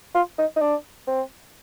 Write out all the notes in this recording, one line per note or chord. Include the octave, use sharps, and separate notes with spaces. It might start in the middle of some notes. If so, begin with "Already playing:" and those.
F4
D#4
D#4
D4
C4